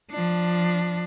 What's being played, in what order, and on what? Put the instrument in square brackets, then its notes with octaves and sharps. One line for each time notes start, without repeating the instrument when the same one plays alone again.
[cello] F3 D4